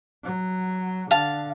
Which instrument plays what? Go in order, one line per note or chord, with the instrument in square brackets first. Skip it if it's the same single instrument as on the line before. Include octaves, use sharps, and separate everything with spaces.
[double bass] F#3
[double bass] D3 [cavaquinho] F5 A5